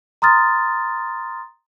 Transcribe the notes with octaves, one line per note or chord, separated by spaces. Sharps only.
A#5 C6 D#6 F6 A6